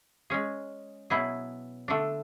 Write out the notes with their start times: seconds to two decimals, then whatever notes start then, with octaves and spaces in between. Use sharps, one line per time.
0.30 G#3 C#4 G#4
1.10 B2 F#3 B3 E4 G#4
1.88 D3 A3 D4